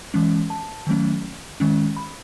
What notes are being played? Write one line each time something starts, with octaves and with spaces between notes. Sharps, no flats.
E3 G#3 C#4
A5
D#3 F#3 A3 C#4
D#3 G#3 C#4
B5